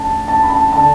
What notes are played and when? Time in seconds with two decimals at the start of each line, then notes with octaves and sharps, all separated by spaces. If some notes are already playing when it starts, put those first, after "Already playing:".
Already playing: D2 D3 A5
0.28 A5
0.43 B5
0.50 A5
0.73 D3 A5